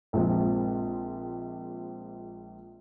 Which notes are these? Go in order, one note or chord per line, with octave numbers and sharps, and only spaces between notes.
A#1 F3 G#3 C4